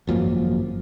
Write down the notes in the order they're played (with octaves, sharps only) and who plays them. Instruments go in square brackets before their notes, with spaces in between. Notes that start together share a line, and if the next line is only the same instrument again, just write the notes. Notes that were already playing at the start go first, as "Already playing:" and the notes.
[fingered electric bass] G#1 F#2 F3 A#3